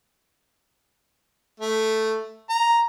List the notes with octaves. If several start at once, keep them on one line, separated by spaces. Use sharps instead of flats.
A3
A#5